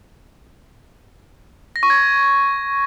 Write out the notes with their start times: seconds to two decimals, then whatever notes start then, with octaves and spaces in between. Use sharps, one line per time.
1.76 A#6
1.83 C#6
1.90 G#6